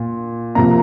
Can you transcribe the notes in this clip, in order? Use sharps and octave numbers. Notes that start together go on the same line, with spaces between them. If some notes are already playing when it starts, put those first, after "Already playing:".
Already playing: A#2
C3 F3 A#3 A#5